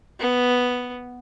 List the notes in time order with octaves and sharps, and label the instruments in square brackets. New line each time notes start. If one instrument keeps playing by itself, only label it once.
[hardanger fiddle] B3